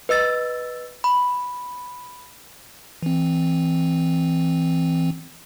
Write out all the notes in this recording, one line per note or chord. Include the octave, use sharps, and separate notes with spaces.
B4 D#5 E6 A6
B5
E3 C4